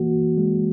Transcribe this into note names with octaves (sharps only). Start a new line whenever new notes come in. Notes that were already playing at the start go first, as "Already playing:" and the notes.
Already playing: E3 A#3 F#4
G#3